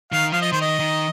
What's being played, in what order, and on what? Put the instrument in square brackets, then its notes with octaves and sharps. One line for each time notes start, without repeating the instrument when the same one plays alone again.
[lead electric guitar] D#3 [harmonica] F5
[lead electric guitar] F3 [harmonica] F5
[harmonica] D#5
[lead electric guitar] D#3 [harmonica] C5
[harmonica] D#5
[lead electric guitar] D#3